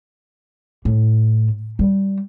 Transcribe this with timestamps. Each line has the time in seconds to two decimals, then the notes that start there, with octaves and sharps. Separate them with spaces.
0.85 A2
1.79 G3